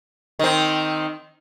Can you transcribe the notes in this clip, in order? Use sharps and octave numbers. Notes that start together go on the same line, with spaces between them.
D#3 C4